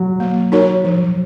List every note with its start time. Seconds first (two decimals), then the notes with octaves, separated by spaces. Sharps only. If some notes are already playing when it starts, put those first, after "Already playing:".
Already playing: F#3
0.20 A#3
0.52 D#4 F#4 A#4 C#5
0.84 F3 F#3